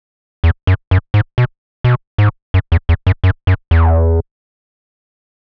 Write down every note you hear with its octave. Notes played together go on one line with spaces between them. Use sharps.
E2
F#2
F#2
G#2
B2
B2
G#2
F#2
E2
E2
F#2
F#2
F#2
E2